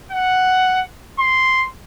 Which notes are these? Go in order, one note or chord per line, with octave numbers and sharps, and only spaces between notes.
F#5
C6